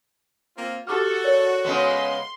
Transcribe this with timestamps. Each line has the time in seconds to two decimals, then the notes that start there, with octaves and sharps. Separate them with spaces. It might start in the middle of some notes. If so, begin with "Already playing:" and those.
0.56 A#3 C4 F4
0.87 F#4 G4 A4 D6 F6
1.24 A#4 C#5 D5
1.65 C#3 G#3 B3 C6